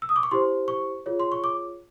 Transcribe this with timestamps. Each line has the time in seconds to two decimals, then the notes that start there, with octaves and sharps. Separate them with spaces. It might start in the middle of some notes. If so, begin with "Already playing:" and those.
0.02 E6
0.09 D#6
0.16 D6
0.23 C#6
0.31 E4 G4 C5 C6
0.68 C#6
1.06 F4 G#4 C#5
1.20 C6
1.32 C#6
1.44 D6